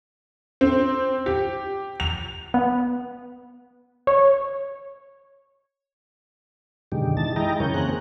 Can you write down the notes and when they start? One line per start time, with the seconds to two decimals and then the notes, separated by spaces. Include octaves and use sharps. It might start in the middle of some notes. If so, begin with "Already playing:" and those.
0.61 C4
1.26 G4
2.00 F7
2.54 B3
4.07 C#5
6.92 F#2 B2 D3 D#3 G#3 G4
7.17 E3 D#4 A5 A6
7.36 G#3 E4 D#5 G5 A#5
7.60 F#2 C#3 E3 A#4 C#5 G6
7.74 C#3 A#3 C4 G#4 A#5 F#6